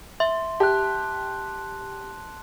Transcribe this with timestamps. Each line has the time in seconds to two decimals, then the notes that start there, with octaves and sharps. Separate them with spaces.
0.20 E5 C6
0.60 G4 A5 F#6